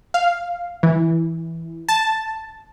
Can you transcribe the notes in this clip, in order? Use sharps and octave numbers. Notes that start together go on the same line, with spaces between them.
F5
E3
A5